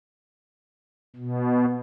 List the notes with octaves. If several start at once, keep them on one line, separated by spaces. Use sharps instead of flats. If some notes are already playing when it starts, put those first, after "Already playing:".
B2